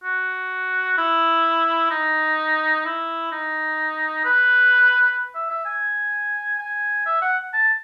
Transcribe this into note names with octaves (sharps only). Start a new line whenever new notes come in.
F#4
E4
D#4
E4
D#4
B4
E5
E5
G#5
G#5
E5
F#5
A5